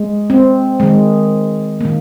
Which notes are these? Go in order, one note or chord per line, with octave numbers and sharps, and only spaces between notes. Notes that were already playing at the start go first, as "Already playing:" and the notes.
Already playing: G#3
C4
D#3 G#3
D#3 A#3